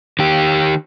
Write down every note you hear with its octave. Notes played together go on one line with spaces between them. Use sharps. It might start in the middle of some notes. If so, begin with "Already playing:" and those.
D#3 G4